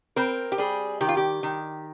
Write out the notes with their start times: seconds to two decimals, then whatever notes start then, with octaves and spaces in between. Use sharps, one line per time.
0.16 C4 A#4
0.52 G4
0.58 G3 G#4
1.01 D#3 G4
1.08 F4
1.17 G4
1.43 D#3